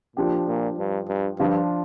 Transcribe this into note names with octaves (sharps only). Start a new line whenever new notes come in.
A#2 F3 D4 G4
A#2
G2
G2
G2 F3 D4 F4